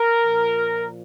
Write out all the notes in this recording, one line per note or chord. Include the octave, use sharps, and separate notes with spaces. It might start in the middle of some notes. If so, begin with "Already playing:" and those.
Already playing: A#4
A#2 F3